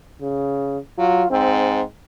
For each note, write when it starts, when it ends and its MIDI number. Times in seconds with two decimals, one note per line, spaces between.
0.21 0.78 49
0.98 1.23 54
0.98 1.26 65
1.31 1.81 44
1.31 1.83 60